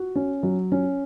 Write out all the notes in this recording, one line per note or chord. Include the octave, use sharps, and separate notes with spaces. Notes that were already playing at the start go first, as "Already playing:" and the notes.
Already playing: F#4
C#4
F#3
C#4